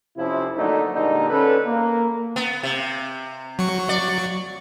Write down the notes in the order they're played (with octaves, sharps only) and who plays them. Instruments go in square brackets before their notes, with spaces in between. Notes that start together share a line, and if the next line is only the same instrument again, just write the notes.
[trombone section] F2 C3 F3 C4 C#4 E4
D3 F#3 A3 A#3 D4 D#4
A#2 D3 G3 G#3 A#3 D#4
D3 C#4 A4 B4
A#3
[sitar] B3
C3
[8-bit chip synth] F#3 C#6
[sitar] D5